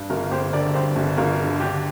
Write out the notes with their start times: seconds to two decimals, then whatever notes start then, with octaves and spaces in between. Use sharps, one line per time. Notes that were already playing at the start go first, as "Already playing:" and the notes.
Already playing: G2
0.10 G1 F4 A#4
0.31 G1 G4 C5
0.53 D3 A#4 D5
0.74 G2 G4 C5
0.96 G1
1.17 G1 F4 A#4
1.39 D3
1.60 D3 D4 G4